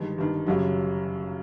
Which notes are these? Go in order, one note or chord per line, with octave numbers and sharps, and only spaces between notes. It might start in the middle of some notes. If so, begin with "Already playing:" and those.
Already playing: G1 G2 D#3 G#3
G1 G2 D#3
F#1 F#2 C#3 G3